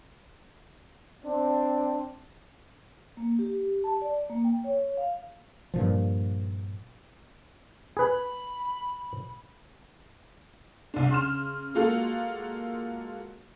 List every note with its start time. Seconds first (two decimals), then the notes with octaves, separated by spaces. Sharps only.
1.24 C4 D4
3.17 A#3
3.39 G4
3.84 A5
4.02 D5
4.29 A#3
4.44 G5
4.64 C#5
4.97 F5
5.74 G2 A#2 F3
7.97 G#4 B4 B5
10.94 C2 D4
11.10 C#3 C6 F6 E7
11.75 G#3 A#3 F4 F#4 A4